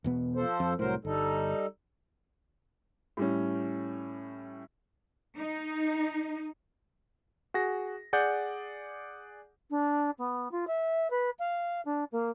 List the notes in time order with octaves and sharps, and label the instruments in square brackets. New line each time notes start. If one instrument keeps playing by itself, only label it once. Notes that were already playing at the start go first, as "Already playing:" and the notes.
[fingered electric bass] E1 B2 B3
[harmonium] F3 A4 C5
[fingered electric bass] F2
[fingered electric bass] C2 A2 [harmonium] F#3 A#4 C5
[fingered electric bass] G1 [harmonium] G3 D#4 A4
[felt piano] A2 G3 C#4
[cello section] D#4
[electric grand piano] F#4 G#4 A#6
G#4 D5 F#5 G6
[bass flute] D4
B3
F4
E5
B4
F5
D4
A#3